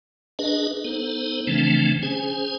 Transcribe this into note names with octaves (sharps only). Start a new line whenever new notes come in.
D4 G#4 B4 D#5
B3 D#4 A4 C5
C#3 E3 F3 A3 C4 D4
C#4 G#4 C5 G#5